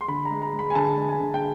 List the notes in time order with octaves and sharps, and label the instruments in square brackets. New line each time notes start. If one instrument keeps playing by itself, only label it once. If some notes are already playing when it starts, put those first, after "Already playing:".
[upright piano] C6
D3 B5
A#5
G#3
A#5
G#3
B5
G#5
D3 A5
G#3
G#5
D3
G5